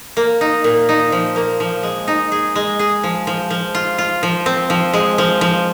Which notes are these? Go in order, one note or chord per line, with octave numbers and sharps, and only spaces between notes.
A#3
D#4
A#2
D#4
F3
A#3
F3
G#3
D#4
G#4
G#3
G#4
F3
F3
F3
F4
F4
F3
C4
F3
G#3
F3
F3